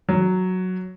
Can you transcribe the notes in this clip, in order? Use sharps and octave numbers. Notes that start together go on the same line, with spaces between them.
F#3